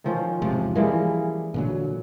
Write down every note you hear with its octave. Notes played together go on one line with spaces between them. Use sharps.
D#3 F3 C#4
E1 G#2 C3 F3
E3 F3 G3 G#3 A#3
A#2 D3 F#3